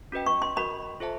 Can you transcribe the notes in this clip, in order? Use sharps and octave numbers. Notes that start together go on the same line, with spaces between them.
C#4 F#4 B4 D#5 G5
C#6
C6
F#4 A#4 D#5 B5
F4 A4 C5 E5 A5